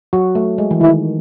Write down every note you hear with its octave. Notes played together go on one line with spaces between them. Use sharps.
F#3 F#4
A3
G#3
E3
D#3 E4